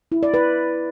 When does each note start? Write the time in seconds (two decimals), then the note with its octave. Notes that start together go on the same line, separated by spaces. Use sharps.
0.12 E4
0.23 D5
0.34 B4